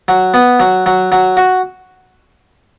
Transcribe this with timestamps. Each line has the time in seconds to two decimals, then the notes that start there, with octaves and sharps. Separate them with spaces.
0.08 F#3
0.34 B3
0.60 F#3
0.86 F#3
1.12 F#3
1.37 F#4